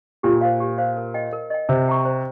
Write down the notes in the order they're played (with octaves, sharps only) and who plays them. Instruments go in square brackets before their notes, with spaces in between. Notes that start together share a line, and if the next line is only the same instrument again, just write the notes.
[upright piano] A#2 [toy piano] G4
[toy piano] C5 F5
G4
C5 F5
A#4
D#5 G5
A#4
D#5 G5
[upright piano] C3 [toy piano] C5
[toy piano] G5 A#5 C#6
C5